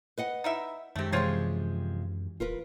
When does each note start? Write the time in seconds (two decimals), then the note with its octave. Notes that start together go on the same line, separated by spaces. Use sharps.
0.18 B4 D#5 F#5
0.44 D#4 E4 E5
0.96 F#2 D#3 G#3 A3 C4 G4
1.12 C3 E3 F3 G#3 F4 C5 C#5
2.40 D#1 F4 A#4 B4